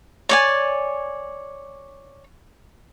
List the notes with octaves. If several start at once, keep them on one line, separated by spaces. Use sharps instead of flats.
C#5 D5 G#5